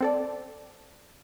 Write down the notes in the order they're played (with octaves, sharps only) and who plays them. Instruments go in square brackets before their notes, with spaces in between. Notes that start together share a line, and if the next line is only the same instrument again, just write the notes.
[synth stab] C4 A4 D5